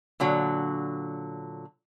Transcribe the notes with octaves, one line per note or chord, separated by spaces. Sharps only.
A#2 D3 F#3